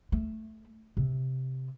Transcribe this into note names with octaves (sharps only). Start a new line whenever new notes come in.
A3
C3